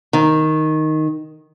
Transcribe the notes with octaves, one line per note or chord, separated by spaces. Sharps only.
D#3